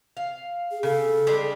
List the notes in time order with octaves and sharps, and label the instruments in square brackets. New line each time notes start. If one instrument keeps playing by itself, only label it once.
[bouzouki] F5
[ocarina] G#4
[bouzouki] C#3 [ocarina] A4
[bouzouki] G3 G#3 D4